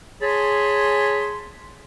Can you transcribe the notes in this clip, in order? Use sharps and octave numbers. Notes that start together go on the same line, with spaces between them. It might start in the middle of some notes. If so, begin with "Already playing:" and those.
G#4 C#5 G#5 A5 B5 C6